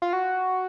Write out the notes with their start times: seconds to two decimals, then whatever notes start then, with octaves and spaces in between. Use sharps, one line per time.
0.02 F4
0.13 F#4